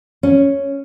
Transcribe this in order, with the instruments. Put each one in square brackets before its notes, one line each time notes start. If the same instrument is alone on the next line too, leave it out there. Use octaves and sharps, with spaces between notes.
[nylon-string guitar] C#4